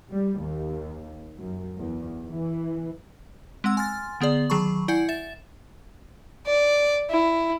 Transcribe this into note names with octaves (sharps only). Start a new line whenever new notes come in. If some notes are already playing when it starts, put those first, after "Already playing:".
G3
D#2
F#2
E2
E3
G#3 C4 F#5 E6
G#5 C6 F6 A6
D3 B3 G#4 D5
D#3 F#3 G#4 A5 B5 C#6
E4 D5 F#5 G#5 G6 C#7
E5 A6 E7
D5
E4